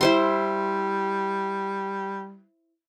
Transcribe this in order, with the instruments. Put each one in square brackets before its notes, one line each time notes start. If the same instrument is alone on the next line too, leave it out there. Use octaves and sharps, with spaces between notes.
[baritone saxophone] G3 [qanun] E4 C5 C6